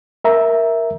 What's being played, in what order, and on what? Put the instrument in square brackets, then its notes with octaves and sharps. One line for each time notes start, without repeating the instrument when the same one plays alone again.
[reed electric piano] A#4 E5 A#5